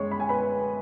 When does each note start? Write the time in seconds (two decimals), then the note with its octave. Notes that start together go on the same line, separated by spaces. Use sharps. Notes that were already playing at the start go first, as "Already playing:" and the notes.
Already playing: F#2 G#3 C#5 C#6
0.11 B5
0.20 G#5
0.29 B4 B5